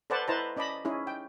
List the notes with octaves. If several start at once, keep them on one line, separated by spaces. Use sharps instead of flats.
A4 B4 C5 D5 F#5 A5
E4 B4 C5 D#5 A5 A#5
C#4 D5 D#5 A5 B5
C#4 D#4 E4 G#4
G5